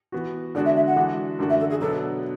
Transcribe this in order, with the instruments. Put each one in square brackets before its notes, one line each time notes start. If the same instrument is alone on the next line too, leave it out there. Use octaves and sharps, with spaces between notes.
[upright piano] E3 B3 F#4
[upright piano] D3 G#3 D4 F#4 [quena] D5
[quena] E5
E5
F#5
[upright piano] E3 G#3 D4 F#4
F#2 D3 A3 D4 F#4
[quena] E5
A4
G#4
[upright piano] B2 F#3 B3 D4 [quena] A4